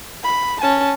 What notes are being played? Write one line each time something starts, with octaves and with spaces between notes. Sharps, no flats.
B5
C#4 A5